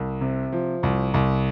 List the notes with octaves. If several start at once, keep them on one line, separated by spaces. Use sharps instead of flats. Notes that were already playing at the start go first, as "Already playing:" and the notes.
Already playing: C2
C3
F3
C2
C2